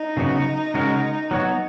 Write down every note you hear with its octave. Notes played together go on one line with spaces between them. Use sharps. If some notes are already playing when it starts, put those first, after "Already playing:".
Already playing: D#4
C#3 F#3 B3 F#4
C#3 G#3 C#4 F#4 A#4
F#3 B3 F#4 C#5